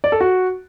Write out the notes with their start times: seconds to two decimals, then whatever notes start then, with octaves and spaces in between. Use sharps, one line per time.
0.04 D5
0.12 A4
0.21 F#4